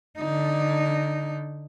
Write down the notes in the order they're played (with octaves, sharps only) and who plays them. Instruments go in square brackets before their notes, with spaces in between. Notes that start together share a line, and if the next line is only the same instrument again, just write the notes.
[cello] D3 D#4